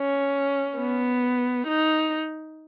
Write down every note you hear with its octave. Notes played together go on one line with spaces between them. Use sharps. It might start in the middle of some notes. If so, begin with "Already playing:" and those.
Already playing: C#4
B3
D#4